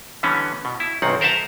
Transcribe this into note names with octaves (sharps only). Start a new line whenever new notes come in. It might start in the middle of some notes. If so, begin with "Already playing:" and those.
D3 E3 G3 B3 C#4
B2
E4
B1 F#2 D#3 C4 F#5
A#4 C5 E5 F#5 A5 A#5